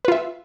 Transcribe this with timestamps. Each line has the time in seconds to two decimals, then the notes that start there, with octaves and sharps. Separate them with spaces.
0.05 B4
0.08 F4
0.12 E5